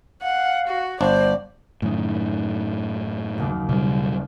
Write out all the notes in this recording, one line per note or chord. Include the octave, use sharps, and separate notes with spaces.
F5 F#5
F#4
G1 D4 C5 D5
F#2 A2 D#3 C#4 D#4
B4
F#1 D#2 D6
B2 G3 F5